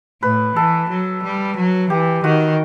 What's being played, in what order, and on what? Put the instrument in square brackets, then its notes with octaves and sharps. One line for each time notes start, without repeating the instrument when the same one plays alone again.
[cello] A2 [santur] B4
[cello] E3 [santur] A4
[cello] F#3
G3
F#3
[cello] E3 [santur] G4
[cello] D#3 [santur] F#4